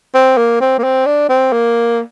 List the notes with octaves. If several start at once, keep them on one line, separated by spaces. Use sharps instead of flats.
C4
A#3
C4
A#3
C4
D4
C4
A#3